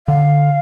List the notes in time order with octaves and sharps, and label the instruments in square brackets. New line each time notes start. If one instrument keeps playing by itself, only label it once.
[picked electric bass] D3 [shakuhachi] F5